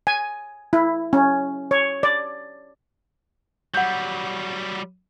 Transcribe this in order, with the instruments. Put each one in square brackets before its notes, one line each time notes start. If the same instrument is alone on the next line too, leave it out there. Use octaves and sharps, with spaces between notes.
[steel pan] G#5
E4
C#4
C#5
D5
[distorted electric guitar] F#3 G3 [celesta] F#5 G6